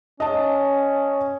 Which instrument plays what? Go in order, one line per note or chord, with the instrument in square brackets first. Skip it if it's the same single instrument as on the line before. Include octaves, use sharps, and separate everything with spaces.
[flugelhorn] C#4 [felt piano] D#5 A5